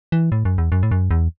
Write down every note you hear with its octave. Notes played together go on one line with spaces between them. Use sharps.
E3
A2
F#2
E2
F#2
A2
F#2
E2